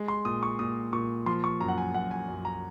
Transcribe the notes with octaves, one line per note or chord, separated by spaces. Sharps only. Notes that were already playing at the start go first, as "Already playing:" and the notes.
Already playing: G#3
C6
A#2 D#6
C#6
A#2 D#6
A#2 C#6
F3 C6
C#6
F#2 A#5
F#5
G#5
F#2 F#5
G#5
F#2
A#5